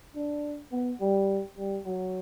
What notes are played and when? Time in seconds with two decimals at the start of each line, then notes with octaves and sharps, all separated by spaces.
0.15 D4
0.71 B3
1.00 G3
1.57 G3
1.85 F#3